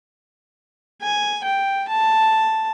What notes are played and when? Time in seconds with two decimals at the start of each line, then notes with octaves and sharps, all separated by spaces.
1.02 G#5
1.44 G5
1.89 A5